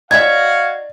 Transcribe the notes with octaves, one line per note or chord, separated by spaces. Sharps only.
D#4 F#4 C#5 D5 E5 F5 G#6